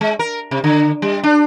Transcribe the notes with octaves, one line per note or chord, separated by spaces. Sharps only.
G#3
A#4
C3
D3
G3
D4